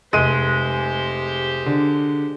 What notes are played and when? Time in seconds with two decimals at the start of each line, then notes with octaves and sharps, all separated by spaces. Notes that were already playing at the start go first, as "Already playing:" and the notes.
0.13 F1 G#3 G4 C5 D#7
1.66 D3